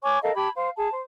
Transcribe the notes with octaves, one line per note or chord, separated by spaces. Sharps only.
C#5 G#5 C#6 D6
A4 A#4 D#5 F5
G4 A5 B5 G#6
C5 F5
G#4 A5
C5